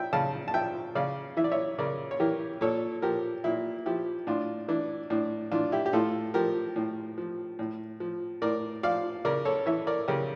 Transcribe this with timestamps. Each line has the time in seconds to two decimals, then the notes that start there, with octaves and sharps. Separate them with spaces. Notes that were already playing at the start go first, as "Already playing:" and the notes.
Already playing: F3 E5 G5
0.13 C#3 F5 A5
0.48 A5
0.54 F3 E5 G5
0.95 C#3 D5 F5
1.37 E3 E5
1.44 D5
1.52 C#5 E5
1.79 C#3 A#4 D5
2.11 C#5
2.20 E3 G4 A#4
2.61 A#2 A4 C#5
3.02 F3 G4 A#4
3.44 A#2 E4
3.86 F3 E4 G4
4.27 A2 D4 F4
4.68 E3 D4
5.10 A2 D4
5.51 E3 D4 F4
5.72 E4 G4
5.86 G4
5.93 A2 F4 A4
6.34 F3 G4 A#4
6.76 A2
7.18 F3
7.59 A2
8.00 F3
8.42 A2 A#4 D5
8.83 F3 D5 F5
9.25 C#3 A#4 D5
9.45 A4 C#5
9.66 E3 C#5 E5
9.87 A#4 D5
10.08 C#3 G4 A#4